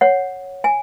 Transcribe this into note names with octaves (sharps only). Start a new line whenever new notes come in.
C#5 F#5
G#5